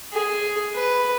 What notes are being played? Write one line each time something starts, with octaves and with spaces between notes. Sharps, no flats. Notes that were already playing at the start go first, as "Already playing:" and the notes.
G#4
B4